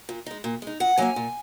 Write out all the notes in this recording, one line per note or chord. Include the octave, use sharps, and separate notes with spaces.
A#2
G#3 D#4
A#2
G#3 D#4
A#2 F#5
F#3 A#3 C#4 G#5
A#2